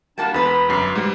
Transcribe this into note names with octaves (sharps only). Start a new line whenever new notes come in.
G3 A#3 D4 F#4 A5
E2 G#3 B4 B5
G1 F#2 C7
G#2 G3